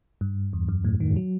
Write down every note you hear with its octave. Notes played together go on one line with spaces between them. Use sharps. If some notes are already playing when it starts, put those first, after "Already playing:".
G2
E2
F#2
A2
D#3
F#3